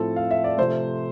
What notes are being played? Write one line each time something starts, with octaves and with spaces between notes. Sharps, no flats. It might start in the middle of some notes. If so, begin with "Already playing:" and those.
Already playing: A2 F3 C4 A4
F5
E5
D5
C3 F3 A3 C5